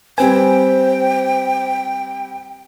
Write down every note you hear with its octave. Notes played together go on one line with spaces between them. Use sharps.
G3 C4 B4 C5 G5 G#5